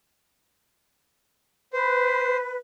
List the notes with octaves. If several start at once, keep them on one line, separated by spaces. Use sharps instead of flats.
B4 C5